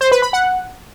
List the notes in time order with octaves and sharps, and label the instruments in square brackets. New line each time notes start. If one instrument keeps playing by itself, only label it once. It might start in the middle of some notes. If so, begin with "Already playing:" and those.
[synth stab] C5
B4
B5
F#5